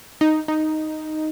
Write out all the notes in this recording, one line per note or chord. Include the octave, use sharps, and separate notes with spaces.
D#4
D#4